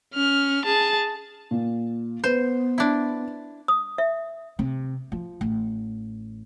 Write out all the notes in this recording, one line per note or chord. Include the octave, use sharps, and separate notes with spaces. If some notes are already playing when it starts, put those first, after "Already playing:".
C#4 F6
G#4 A5
A#2
B3 B4 C5
D4 E4
D#6
E5
C3
F3
A1